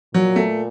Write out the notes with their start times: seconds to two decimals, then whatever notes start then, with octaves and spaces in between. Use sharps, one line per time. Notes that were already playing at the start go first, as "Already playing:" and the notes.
0.14 A#2 F#3
0.36 A3